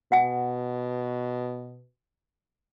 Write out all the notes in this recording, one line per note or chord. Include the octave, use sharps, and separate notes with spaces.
B2 F#5 G#5